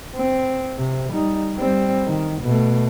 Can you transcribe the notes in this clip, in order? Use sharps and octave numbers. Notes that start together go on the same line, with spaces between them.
C4
C3
G3 D#4
G3 C4
D#3
B2 A3